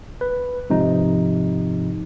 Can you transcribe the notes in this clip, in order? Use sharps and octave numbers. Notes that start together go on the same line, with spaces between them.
B4
G#2 C3 F3 D#4